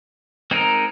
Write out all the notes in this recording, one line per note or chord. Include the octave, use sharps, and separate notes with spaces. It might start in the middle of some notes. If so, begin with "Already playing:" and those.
G#3 C4 D#4 A#4